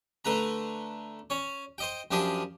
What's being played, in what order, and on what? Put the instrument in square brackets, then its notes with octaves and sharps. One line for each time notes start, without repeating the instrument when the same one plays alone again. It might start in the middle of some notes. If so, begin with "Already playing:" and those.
[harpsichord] D3 A3 B4 A#5
C#4 C#5
C5 D#5 G5
F#2 F3 D4 G4 D#6